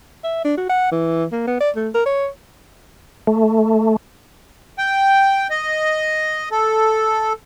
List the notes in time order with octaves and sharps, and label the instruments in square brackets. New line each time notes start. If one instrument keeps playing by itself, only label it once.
[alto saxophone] E5
D4
F#4
F#5
E3
A#3
B3
D5
A3
A#4
C#5
[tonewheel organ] A3
[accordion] G5
D#5
A4